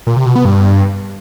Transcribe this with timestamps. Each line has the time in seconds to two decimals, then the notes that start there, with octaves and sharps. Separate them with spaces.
0.07 A#2
0.16 C3
0.26 B2
0.36 B3
0.45 G2